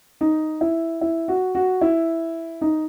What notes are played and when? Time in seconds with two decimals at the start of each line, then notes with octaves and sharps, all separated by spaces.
0.21 D#4
0.61 E4
1.01 E4
1.28 F#4
1.55 F#4
1.81 E4
2.61 D#4